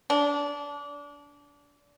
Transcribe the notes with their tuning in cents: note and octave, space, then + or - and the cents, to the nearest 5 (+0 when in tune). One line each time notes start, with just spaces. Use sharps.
D4 -25